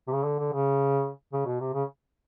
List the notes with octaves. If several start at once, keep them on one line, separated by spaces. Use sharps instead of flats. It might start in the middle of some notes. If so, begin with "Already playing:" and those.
C3
C#3
D3
D3
C#3
C#3
B2
C3
C#3